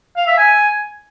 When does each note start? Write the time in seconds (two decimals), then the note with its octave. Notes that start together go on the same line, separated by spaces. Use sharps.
0.16 F5
0.27 E5
0.38 G#5